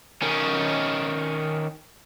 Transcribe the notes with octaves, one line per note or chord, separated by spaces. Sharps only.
D#3 C#4